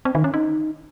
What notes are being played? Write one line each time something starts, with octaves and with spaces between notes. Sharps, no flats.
C4
D#3
C#4
D#4